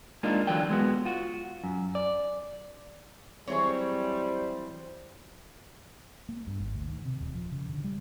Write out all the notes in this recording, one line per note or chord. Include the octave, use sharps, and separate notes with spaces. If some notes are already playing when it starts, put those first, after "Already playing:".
G#3 A#3 D4 D#4 F4
D3 E3 F#3 F4 D5 G5
G#3 B3 F#4
F4 F#4
F#2
D5
E3 F#3 G3 C4 G#4 C5 C#5
A#3
G2
G#1
D2
D#3
C3
D#1
F3
C#3
D3
G3